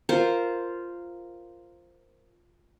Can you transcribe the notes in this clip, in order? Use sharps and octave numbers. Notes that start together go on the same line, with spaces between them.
F4 A#4 C5